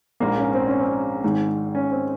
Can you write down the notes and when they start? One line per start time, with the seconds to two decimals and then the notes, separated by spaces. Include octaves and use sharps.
0.20 A#1 G#2 F3 A#3
0.38 C#4
0.54 C4
0.67 C#4
0.80 C4
1.24 G#1 G#2 D#3
1.75 C#4
1.92 C4